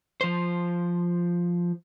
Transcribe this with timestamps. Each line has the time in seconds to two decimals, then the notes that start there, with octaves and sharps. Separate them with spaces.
0.21 F3 C5